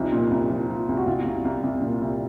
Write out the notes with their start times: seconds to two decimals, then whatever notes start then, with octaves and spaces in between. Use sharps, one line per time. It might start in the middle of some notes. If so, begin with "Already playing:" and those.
Already playing: C2 F3 D#4
0.13 A#2
0.31 C2
0.50 F3
0.69 F3
0.89 C2
0.97 F#4
1.07 C2 F4
1.25 C2
1.45 C2
1.64 C2
1.82 A#2
2.02 C2